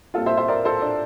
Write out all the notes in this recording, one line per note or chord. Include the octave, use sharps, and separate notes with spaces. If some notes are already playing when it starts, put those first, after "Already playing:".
A#2 G3 C4 F4 A4
C5 E5
C5 E5
A#4 D5
A4 C5
D4